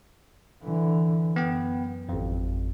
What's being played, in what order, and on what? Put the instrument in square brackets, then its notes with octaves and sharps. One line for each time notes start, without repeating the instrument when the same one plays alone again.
[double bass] D3 E3
[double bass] F#2 [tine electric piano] B3 G5
[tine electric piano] G#1 F2